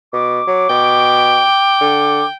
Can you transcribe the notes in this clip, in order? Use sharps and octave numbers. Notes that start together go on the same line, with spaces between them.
B2 D6
F#3
B2 G5
D3